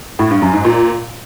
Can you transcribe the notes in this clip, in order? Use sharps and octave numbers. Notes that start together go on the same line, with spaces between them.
A2
G2
F#2
G#2
A#2